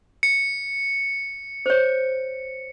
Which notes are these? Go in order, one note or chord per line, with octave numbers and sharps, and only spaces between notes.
C#7
C5 C#5